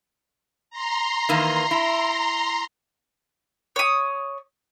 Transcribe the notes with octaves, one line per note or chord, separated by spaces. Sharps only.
A#5 C6
D#3 E3 A#3
E4
C#5 D#6